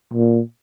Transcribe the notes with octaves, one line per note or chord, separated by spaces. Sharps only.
A#2